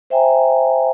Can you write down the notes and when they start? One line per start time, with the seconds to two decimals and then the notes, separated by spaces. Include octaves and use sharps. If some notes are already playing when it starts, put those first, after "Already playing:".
0.10 C5 E5 G5 G#5 A#5